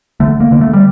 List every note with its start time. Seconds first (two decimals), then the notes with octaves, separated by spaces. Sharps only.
0.20 D3 A3
0.40 A#3
0.51 D3 A#3
0.61 A3
0.73 G3